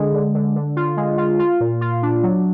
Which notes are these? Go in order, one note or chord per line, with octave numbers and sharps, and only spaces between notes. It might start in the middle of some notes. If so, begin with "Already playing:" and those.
Already playing: D3 G#3
D3
D3
D3
F4
G#3
F4
F4
A#2
F4
D4
F#3